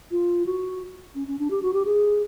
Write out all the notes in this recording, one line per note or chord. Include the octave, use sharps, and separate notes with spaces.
F4
F#4
C#4
C#4
D4
G4
F#4
G4
G#4